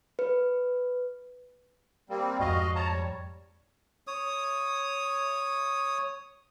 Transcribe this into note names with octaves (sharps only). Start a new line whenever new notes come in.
B4
G3 A#3 C4
F2 G#2 F#4 D#5 F5
C#5 A5 A#5
G3
C#5 D#6